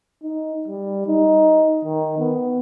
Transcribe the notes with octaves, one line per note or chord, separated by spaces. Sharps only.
D#4
G3
D#4
D#3
B3